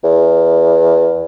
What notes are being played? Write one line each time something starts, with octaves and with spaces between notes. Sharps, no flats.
E2